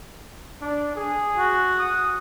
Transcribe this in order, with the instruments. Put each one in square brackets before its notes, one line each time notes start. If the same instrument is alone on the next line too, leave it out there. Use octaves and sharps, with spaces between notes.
[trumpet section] D4
G#4
[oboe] F#4
[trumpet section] F#5 D#6